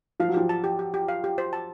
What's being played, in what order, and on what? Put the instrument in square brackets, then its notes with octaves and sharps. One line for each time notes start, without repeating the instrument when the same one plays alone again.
[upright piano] F3 [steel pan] F5
[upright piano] F#3
[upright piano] F3 [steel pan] G4
[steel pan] A5
G4
G4
G4
F5
G4
C5
A5